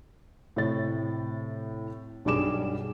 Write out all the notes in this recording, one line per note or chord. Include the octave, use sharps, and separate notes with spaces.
A2 C3 C#5 A6
B1 G2 G3 G#4 D6 E7